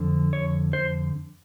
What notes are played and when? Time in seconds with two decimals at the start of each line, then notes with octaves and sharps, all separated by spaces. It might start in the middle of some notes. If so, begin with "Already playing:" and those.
Already playing: F2 D3 F3
0.33 C#5
0.73 C5